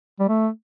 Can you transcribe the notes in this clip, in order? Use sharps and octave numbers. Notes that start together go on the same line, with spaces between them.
G3
A3